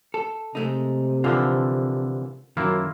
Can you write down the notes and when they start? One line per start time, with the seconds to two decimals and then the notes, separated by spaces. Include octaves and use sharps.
0.14 A4
0.55 C3 G#3 A3 D#4
1.24 D3 E3 F3 F4 A4 A#4
2.57 F#2 D#3 A#3 E4 F4